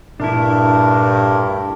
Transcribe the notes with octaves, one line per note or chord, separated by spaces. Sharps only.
G2 A#2 A3 D4 E4 A#4